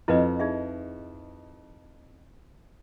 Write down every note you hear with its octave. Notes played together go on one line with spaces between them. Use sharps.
F2 E4 B4 D#5
D#4 G#4 E5